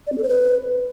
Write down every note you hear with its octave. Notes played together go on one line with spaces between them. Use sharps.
D5
C4
A4
C5
B4